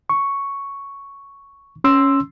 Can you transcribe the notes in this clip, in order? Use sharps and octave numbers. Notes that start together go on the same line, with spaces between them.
C#6
C#4 C6 E6